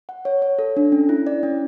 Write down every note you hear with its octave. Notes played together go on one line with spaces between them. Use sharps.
F#5
C#5
C#5
A4
D4
C#4
E4
D5
C#4